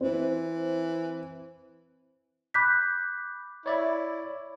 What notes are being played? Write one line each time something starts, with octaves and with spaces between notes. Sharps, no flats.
E3 C4
B5 D6 F#6 G6 B6
E4 C#5 D5 E5